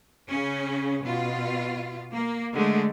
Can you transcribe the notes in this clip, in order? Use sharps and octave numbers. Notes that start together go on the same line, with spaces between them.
C#3 C#4
B2 F4
A#3
D3 G#3 A3